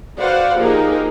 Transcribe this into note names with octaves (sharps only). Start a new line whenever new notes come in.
F#4 B4 C5 D5 F5 F#5
F3 A#3 D#4 G4 G#4 A#4